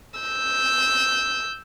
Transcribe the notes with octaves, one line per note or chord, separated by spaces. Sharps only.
E6 G6